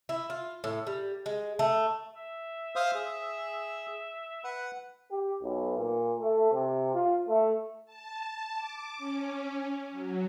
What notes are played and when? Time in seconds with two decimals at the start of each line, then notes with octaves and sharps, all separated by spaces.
0.09 E4
0.30 F4
0.64 A2
0.87 G3
1.26 G#3
1.59 A3
2.16 E5
2.76 C5 F5 D#6
2.95 G#4
4.44 B4 F#5
5.11 G4
5.41 B1
5.78 A#2
6.19 A3
6.52 C3
6.95 F4
7.28 A3
7.86 A5
8.56 D6
8.98 C#4
9.91 F#3